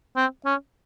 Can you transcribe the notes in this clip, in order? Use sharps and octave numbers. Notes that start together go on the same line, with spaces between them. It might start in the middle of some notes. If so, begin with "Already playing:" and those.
C4
C#4